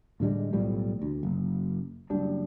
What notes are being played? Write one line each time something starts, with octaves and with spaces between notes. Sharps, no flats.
A2 D3 G3 G#3
B1 A2 F3 G3
D2
F#1
F#1 G3 D4